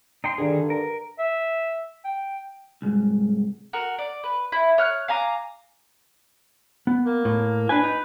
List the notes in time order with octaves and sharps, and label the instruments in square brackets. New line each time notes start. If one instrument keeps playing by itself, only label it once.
[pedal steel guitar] D#4 G5 C6
[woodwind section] G2 D3 [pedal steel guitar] D#3 G#4
[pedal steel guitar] A#4
[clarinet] E5
G5
[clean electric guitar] C2 G#2
[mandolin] F#4 A#4
D5
B4
E4
C#5 F6 F#6
F5 G#5 A#5 D6
[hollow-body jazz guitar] B3
[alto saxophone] A#3
[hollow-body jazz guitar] A2
[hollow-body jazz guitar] D4 G#5 [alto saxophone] B4
[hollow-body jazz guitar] D#4